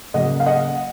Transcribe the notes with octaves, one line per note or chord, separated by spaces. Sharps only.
C#3 F#3 A#3 D#5 F#5
F5
D#5 F#5